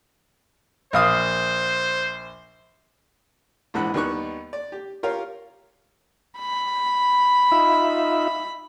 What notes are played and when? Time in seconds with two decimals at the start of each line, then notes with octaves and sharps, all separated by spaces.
0.93 A#1 C5 F5 D#6
3.74 A#1 E2 G#2 E3 F#5 B5
3.94 D#2 G3 B3 D#4 C#6 F#6
4.53 D5
4.72 G4
5.03 F4 G4 A#4 C#5 F5
6.39 B5
7.51 D#4 F4 E5